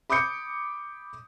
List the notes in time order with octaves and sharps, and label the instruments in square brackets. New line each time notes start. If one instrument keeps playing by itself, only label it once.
[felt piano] B5 D6 D#6 G6 C#7